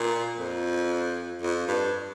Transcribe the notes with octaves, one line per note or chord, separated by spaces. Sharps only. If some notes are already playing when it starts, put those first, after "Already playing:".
Already playing: A#2
F2
F2
G2